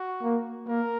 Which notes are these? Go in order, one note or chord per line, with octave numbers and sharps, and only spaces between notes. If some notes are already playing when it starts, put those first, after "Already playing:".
Already playing: F#4
A#3
A#3 A#4